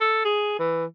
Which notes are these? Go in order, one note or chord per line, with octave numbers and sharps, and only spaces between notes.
A4
G#4
E3